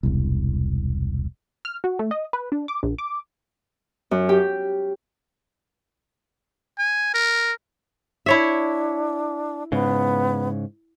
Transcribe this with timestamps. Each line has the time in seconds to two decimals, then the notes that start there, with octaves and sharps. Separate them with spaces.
0.03 E1 C2
1.65 F6
1.84 F#4
1.99 A3
2.11 D#5
2.33 B4
2.52 D4
2.68 D6
2.83 A#1
2.98 D6
4.11 F#2
4.29 G4
6.79 G#5
7.14 A#4
8.26 D4 E4 C#5 E5
9.72 G#2 C#3 B3